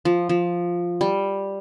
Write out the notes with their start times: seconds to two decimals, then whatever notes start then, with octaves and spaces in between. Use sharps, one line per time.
0.05 F3
0.29 F3
1.01 G3